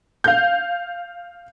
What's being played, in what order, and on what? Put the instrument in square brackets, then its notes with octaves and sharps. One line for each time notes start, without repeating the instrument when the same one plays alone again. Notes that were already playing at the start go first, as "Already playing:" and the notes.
[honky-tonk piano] F5 G6